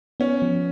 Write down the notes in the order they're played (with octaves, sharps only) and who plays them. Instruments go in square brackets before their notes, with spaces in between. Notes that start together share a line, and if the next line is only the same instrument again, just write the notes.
[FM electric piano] B3 [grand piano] C#4
[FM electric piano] F3